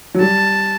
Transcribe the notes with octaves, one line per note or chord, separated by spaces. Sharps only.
F#3
G3 A5